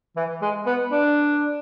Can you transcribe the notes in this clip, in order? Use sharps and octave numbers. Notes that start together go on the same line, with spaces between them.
E3
G#3
B3
D4